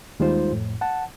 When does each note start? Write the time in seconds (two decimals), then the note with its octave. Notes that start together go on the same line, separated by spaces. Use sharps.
0.20 D#2 G3 G#3 D#4 F4 C5
0.52 F2 A2
0.81 F#5 A5